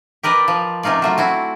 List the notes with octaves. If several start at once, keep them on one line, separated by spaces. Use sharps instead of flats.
G4 A#4 B4 D5 D#5
F3
C3 C#4 D#4 F4 D5
F#3 A3 F4
C4 E4 F#4